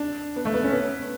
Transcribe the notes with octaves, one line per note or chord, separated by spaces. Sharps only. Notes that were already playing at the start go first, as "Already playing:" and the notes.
Already playing: D4
B3
A3
B3
C#4
B3